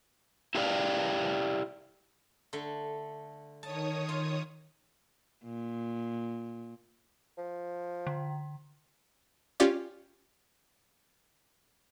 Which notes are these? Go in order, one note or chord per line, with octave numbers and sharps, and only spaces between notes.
E4 F4 G4 A#4 D5 F5
D3 A3
D#3 C#5 A5 D#6
F4
A#2
F3
D3
C#4 F4 G4 D5